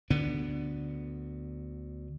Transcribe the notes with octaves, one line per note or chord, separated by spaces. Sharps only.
D2 D3 B3 D4